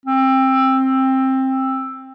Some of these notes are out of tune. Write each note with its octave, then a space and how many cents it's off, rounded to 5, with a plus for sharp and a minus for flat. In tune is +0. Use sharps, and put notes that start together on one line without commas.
C4 +15